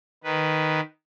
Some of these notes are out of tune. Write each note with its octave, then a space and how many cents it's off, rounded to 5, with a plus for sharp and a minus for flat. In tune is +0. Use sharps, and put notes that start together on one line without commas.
D#3 +0 B4 +0